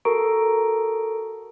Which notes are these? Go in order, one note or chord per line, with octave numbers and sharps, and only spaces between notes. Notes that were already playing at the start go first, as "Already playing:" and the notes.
F#4 A4 A#4 A#5 C#6 D7